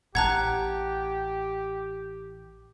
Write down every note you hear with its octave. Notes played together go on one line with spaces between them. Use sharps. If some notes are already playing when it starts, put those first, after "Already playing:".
A1 G4 F#5 A5 A#5 F#6 G#6